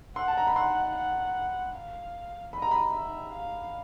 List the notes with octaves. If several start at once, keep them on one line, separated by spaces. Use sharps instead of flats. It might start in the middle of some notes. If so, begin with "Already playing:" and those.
F#5 C6
A5
A#5
B5
F#5 C6
F#5
F5
D#5 B5
A#5
B5
E5
F5